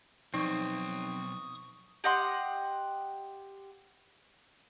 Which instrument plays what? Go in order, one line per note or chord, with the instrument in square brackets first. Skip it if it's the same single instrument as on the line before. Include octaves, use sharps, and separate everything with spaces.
[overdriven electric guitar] B1 [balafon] F3 D#4 [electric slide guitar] C4 [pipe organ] C#6 D#6
[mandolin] G4 D#5 F#5 C6